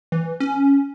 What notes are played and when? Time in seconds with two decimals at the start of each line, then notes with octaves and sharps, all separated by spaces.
0.12 E3
0.40 C#4